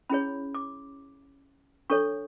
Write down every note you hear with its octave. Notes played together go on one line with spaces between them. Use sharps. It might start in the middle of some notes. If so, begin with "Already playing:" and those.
C#4 E4 G#4 C#5 B5
D6
D4 A4 C#5 C#6